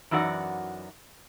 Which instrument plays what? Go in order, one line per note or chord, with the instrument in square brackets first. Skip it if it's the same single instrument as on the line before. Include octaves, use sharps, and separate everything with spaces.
[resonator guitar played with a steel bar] F#2 E3 D#4 F#4 D5 F#5